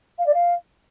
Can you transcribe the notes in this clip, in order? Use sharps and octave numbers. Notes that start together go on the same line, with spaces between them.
F5
D5
F5